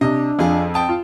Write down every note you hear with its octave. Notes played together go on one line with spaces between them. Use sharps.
C3 D4 D#5
F2 F4 G#4
C4 G5 A5 D#6
F4